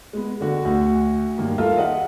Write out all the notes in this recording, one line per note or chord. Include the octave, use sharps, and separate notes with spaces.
G#3 B3
D3 F#4
D2 F#4
G2 D#3 A#3
F4 A4 A#4 E5 F5
G#4 D#5 E5 F#5